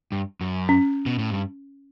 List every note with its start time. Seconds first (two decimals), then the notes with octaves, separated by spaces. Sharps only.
0.12 G2
0.41 F#2
0.69 C#4
1.06 B2
1.19 A2
1.30 G2